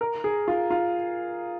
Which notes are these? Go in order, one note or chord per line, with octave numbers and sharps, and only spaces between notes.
A#4
G#4
F4
F4